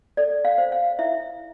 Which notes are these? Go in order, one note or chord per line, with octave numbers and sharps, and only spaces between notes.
A4 D5
F5
C5
F5
E4 E5